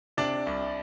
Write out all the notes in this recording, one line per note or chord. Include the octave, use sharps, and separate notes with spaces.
C3 D4 D5
C2